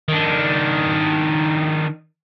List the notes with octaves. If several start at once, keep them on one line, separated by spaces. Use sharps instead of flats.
D#3 D4